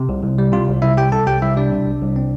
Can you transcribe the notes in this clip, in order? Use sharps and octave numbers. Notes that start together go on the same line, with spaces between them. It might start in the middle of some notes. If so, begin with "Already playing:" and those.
Already playing: C3
C2
C2
G3
C3 F4
C2
C2 E4 E5
G3 G4 G5
C3 A4 A5
C2 G4 G5
C2 E4 E5
G3 D4 D5
C3
C2
C2
C4